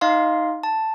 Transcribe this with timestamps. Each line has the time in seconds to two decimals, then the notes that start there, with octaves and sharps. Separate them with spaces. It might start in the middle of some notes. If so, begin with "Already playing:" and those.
0.01 D#4 D#5 F5 C6
0.63 A5